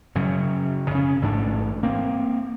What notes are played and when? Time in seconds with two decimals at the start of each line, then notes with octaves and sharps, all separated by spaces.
0.15 F#2 C#3 F#3
0.91 C#3 C#4
1.22 A1 G#2 D4
1.83 A#3 C4